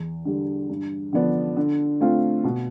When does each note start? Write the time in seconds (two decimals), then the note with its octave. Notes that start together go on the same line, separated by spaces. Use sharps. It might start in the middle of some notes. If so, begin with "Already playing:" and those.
Already playing: E2
0.25 D3 G3
0.70 G2
1.13 D3 F3 B3 D4
1.57 D3
2.01 A3 C4 F4
2.44 B2